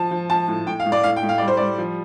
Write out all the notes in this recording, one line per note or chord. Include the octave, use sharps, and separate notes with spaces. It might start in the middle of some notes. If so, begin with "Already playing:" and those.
Already playing: F3 A5
F3
F3 A5
A2
A2 G5
F5
A2
D5
A2 F5
G5
A2
F5
G3 D5
C5
G3 D5
F3